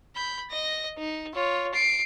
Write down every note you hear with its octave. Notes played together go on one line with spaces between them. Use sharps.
B5 G6
D#5 A#6
D#4
F4 C#5
C7 D7